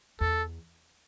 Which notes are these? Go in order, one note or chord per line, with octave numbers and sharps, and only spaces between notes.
E2 A4